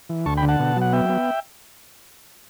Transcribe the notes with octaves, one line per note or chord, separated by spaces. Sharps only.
E3
D2 A5 C#6
G5 B5
D3
F#5 A5
B2
F#3
F#5
B3 E5 G5
B3